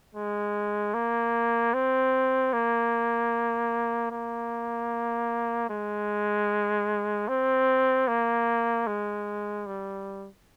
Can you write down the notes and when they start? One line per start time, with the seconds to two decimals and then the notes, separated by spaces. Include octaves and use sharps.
0.15 G#3
0.94 A#3
1.74 C4
2.53 A#3
4.11 A#3
5.70 G#3
7.28 C4
8.08 A#3
8.87 G#3
9.66 G3